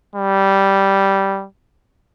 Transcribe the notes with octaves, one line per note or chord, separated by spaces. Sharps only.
G3